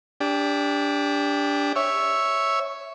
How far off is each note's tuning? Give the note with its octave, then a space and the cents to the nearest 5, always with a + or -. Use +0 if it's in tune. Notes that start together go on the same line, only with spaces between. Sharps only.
D4 -20 G4 +20
C#5 +0 E5 +0